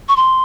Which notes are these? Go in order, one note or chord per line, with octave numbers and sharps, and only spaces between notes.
C#6
C6